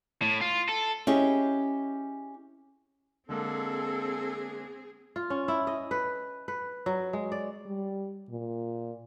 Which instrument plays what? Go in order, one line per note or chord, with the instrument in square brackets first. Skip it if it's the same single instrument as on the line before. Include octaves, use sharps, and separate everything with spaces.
[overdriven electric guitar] A2
F4
A4
[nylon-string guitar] C#4 E4 G4 G#4 D#5
[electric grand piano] D3 G#3 A#3 [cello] C4 G#4 [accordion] A4
[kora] F4
C#4
E4
D#5
B4
B4
F#3
G#3
D5
[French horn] G3
A#2